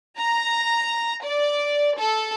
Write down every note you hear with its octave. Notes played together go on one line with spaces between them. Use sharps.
A#5
D5
A4